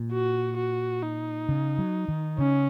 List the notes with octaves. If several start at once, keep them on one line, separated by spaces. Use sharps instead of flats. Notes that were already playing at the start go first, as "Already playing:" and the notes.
Already playing: A#2
F#4
F#4
D#4
C#3
F#3
D#3
C#3 C#4